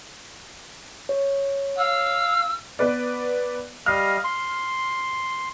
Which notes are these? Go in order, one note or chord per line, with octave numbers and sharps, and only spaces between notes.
C#5
F5 E6
B3 B4 D5
G3 D#5 F5 F6
C6